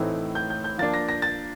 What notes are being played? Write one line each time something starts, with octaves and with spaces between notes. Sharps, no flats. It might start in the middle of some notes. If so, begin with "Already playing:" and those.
Already playing: A2 E3 A3 C4 D#4
G6
G6
G6
F3 A#3 D4 A6
A#6
A#6
A6